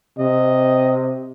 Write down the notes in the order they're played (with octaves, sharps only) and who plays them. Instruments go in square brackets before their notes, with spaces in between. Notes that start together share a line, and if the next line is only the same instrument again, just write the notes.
[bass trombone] C3 [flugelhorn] D#5